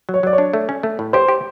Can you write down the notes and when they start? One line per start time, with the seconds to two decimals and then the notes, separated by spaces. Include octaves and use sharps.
0.09 F#3
0.14 C#5
0.23 F#3 D5
0.33 C#5
0.38 D4
0.53 A3
0.69 C#4
0.83 A3
0.99 A2
1.13 G4 C5
1.28 G4